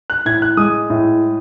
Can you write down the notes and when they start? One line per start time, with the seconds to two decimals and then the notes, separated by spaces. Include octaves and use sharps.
0.10 F#6
0.25 A2 G#6
0.42 F#6
0.57 G#3 D#6
0.90 A2